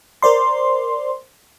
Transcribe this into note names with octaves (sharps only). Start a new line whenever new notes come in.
A#4 C5 D5 C6